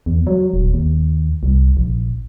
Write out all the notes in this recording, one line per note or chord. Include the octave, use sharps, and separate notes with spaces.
E2
F#3
D#1
D#2
C2
A#1